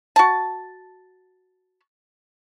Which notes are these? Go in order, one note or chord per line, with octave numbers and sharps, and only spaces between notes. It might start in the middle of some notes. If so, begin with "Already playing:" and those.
F#4 A5